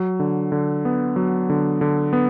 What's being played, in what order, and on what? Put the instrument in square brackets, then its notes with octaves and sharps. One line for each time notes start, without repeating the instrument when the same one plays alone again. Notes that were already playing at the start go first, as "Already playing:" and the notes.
Already playing: [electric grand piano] F#3
D3
D3
B3
F#3
D3
D3
B3